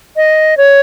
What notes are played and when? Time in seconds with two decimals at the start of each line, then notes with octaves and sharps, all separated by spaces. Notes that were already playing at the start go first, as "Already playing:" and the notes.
0.16 D#5
0.57 C#5